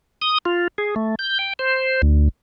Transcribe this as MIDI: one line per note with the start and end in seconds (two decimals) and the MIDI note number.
0.22 0.38 87
0.45 0.68 65
0.78 0.95 68
0.96 1.15 57
1.19 1.38 91
1.39 1.53 79
1.59 2.02 72
2.02 2.29 38